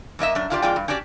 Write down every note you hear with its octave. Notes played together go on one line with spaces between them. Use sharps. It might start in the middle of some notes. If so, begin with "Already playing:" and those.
F#2 A#3 D#5 E5
F#2 D4
A#2 D4 F4 G4 B4 D5
F2 G#3 F4 D5 G5 G#5
G2
C#4 D4 F#4 G4 D5